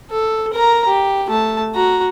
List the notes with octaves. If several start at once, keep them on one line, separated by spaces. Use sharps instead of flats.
A4
A#4 A#5
G4
A3 A5
F#4 A#5